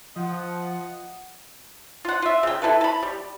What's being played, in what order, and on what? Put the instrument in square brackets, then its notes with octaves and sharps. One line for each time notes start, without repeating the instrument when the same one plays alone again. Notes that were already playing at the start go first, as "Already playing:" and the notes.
[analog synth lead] F3 [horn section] F4 D#5 F#5
[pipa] F4 F#5
F4 E5
C#3 G5
E4 G#4 A4 B4
A5 B5
G3